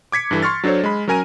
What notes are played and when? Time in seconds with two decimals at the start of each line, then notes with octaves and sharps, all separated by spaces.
0.12 D6 G#6 B6 C#7
0.31 G2 E3 A4
0.42 C6 C#6 F6 A6
0.64 F#3 D4 A4 C5 C#5
0.84 G#3 B5
1.08 F#3 C#4 A#4 G#5 A#5 D#7